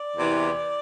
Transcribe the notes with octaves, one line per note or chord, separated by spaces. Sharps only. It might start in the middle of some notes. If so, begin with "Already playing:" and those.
Already playing: D5
E2 C3 E3